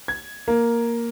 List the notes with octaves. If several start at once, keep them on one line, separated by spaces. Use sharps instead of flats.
G#6
A#3